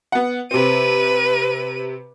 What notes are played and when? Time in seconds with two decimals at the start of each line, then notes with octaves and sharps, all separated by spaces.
0.12 B3 F#5
0.51 C3 C4 B4 D#7